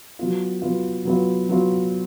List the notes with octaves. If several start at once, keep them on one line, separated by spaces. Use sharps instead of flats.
F#3 B3 F4
F#3 B3 F4
F#3 B3 F4
F#3 B3 F4